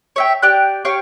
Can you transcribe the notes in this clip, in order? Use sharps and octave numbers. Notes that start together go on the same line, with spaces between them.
C#5 E5 G5
G4 D5 G5 F#6
G4 C#5 F5 G5